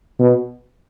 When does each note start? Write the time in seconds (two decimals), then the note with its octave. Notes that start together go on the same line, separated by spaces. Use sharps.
0.19 B2